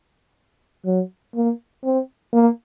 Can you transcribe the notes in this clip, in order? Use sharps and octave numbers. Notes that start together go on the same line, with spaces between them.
F#3
A#3
C4
A#3